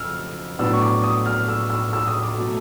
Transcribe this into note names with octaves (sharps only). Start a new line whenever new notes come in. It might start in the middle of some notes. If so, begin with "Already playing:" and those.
Already playing: F2 C#3 F#3 E6 F6
A2 F#3 B3 D4 E6
C#6
D6
D#6
F6
E6
E6
E6
D#6
D6
B2 F#3 A3